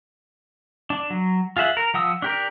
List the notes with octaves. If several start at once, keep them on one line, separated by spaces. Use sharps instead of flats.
D4
F#3
F4 G#4 E5 F#5
A#4
F3 F#5 D#6 E6
D4 G4 A#4